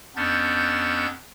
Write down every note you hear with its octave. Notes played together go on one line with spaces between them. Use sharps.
F2 B3 C#4 D4 G6 A6